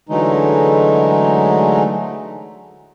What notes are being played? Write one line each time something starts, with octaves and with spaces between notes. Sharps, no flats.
D3 E3 F#3 G#3 A3 D#4